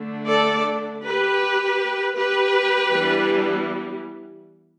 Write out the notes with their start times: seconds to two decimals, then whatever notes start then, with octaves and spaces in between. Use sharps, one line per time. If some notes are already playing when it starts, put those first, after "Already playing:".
Already playing: D3 A3 D4
0.27 A4 D5
1.03 G4 B4
2.16 G4 B4
2.91 E3 G3 B3 D4